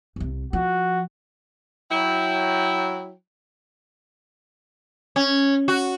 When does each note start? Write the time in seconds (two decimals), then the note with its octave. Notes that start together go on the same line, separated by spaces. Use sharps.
0.16 C2 C3
0.53 F3 F#4
1.91 F#3 E4 G5
5.16 C#4
5.68 F#4